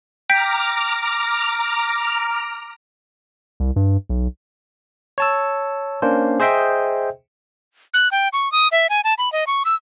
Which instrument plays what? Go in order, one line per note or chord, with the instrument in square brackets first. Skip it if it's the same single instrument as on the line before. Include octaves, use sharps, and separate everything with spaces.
[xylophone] G5 G6 B6 [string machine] A#5 D6 F6
[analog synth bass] C2
G2
B1
[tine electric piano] C#5 A5 E6
A#3 C#4 D4 C5
G#4 C5 D#5 E5 G5
[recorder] F#6
G5
C#6
D#6
E5
G#5
A5
B5
D#5
C#6
E6